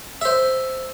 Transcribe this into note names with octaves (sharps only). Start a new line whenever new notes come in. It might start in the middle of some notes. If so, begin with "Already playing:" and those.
C5 E5